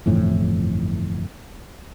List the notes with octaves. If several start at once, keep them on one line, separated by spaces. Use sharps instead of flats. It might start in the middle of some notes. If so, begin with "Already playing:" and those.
G1 F2 A2 E3